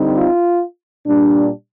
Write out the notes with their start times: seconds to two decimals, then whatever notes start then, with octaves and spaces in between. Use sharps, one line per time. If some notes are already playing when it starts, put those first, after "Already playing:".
Already playing: D3 G3 C4 D#4
0.15 F4
1.06 A#2 G3 D4